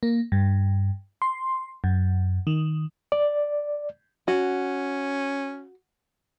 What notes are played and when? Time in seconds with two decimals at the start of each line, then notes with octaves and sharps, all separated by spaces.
0.03 A#3
0.32 G2
1.22 C6
1.84 F#2
2.47 D#3
3.12 D5
4.28 C#4 F#4